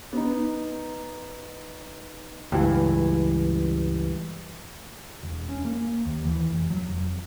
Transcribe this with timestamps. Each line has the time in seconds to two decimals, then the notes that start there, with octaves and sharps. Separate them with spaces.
0.13 B3 D#4
2.52 C#2 G2 E3
5.23 E1
5.49 C#4
5.65 A#3
6.05 D#2
6.25 E3
6.51 F1
6.70 F#3
6.88 F1